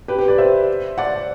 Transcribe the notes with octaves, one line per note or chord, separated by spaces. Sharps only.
G4 B4
G4
B4 D5
C5 E5
D5 F#5